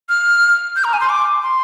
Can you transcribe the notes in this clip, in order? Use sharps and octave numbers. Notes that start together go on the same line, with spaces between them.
F6
G6
A#5
G#5
C6
D6
C6